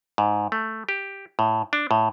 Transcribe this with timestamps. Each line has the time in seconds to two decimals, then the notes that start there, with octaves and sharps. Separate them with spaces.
0.18 G#2
0.52 A3
0.89 G4
1.39 A2
1.73 D4
1.91 A2